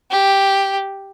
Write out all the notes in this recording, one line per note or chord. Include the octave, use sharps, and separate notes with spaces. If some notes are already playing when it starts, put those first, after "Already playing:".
G4